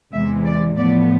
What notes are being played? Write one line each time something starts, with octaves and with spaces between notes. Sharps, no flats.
E2 C3 E3 G#3 E5
D5
A2 F3 B3 D5